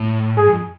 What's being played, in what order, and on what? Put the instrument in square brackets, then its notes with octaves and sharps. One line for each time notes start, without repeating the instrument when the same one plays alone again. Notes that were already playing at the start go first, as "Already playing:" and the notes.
Already playing: [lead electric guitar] A2
[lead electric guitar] G#2 [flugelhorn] G#4
[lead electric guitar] F2